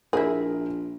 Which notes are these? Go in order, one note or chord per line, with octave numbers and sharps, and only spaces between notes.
A#1 E4 G#4 A#4